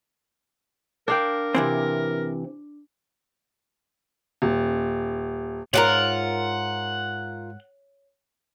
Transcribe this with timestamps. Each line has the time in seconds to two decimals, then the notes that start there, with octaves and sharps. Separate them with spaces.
1.08 D4 A#4 F5 G5
1.55 C3 E3 C4
4.42 D#1
5.74 G#2 F4 F#4 A#4 C#5 F#5